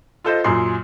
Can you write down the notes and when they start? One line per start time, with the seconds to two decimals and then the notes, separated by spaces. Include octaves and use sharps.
0.24 F4 A4 C5 D#5
0.44 F#2 A#2 G#4 C6